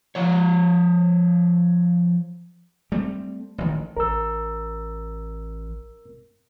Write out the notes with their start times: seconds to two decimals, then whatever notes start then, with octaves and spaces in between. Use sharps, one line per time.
0.15 F3 C#5
2.92 G3 A3 C4
3.58 A1 D#3
3.97 A1 A#4 E6